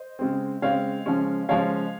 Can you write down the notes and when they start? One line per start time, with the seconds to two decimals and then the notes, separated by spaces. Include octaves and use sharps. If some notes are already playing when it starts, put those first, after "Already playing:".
Already playing: C5 D#5
0.19 C#3 G#3 C4
0.62 C#3 G#3 C4 C#5 F5
1.06 C#3 F3 G#3 C#4
1.49 C#3 F3 G#3 C#4 C#5 F5